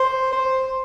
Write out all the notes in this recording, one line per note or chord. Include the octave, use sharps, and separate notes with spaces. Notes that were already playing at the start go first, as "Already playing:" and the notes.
Already playing: C5
C5